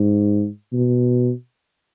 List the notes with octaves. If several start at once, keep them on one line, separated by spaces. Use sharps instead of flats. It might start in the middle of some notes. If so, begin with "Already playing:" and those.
Already playing: G#2
B2